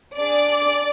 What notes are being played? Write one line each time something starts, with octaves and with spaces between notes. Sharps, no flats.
D4 G#4 D5